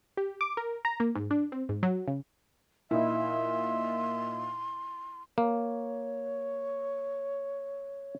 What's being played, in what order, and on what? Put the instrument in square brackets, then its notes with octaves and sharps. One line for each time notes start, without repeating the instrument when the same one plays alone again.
[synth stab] G4
D6
A#4
A#5
A#3
G#2
D4
C4
G#2
F#3
C#3
[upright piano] A#2 D#4 [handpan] E4 [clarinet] E5 [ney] C6
[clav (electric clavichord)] A#3 [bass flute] C#5